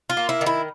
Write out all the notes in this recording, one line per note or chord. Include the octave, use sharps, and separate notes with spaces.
F4
A#3
E4
D#3
E4